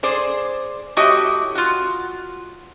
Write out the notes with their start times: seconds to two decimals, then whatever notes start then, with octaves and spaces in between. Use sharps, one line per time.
0.03 G#4 C5 D5
0.97 A3 E4 F#4 G4 C#5 D#5
1.55 F4 F#4